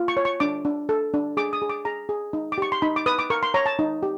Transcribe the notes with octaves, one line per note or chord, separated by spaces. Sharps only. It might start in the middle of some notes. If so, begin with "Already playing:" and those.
Already playing: F4
C#6
C#5
C#6
D4 D6
D4
A4
D4
G#4 D6
D#6
G#4
D6
G#4 A#5
G#4
D#4
D6
G4 C#6
C6
D#4 B5
D6
B4 D#6
D6
A#4 C#6
C6
C#5 A#5
A5
D#4
G4